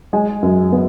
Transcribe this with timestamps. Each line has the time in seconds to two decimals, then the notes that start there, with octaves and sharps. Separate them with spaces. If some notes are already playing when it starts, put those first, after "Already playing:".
0.13 G#3 G#5
0.43 F#2
0.72 B3